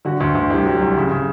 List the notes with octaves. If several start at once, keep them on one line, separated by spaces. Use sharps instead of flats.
D3 F#4
D2
D2
C2 G4
F#3
C2
C#3
C#3